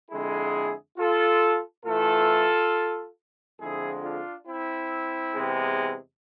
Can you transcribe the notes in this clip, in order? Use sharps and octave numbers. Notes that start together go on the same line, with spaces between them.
F2 D3 G#3 E4 G#4
F4 A4
A2 E3 A3 F4 A4
F2 D3 F3 G#3 E4 G#4
D4 F4
C4 E4
E2 C3 G#3